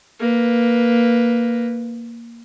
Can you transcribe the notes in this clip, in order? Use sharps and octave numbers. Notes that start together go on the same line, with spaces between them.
A#3 B4